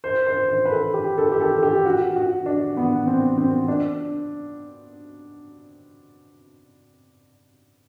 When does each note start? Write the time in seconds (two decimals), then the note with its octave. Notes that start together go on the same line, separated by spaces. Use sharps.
0.04 C5
0.27 C5
0.48 C5
0.65 B4
0.71 A4
0.94 G4
1.18 A4
1.32 G4
1.40 A4
1.63 G4
1.86 F#4
2.16 F#4
2.46 D4
2.77 B3
3.07 C4
3.38 C4
3.68 D4